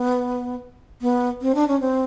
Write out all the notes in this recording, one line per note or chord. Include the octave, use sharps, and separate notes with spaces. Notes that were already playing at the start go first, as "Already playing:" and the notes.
Already playing: B3
B3
C4
D4
C#4
C4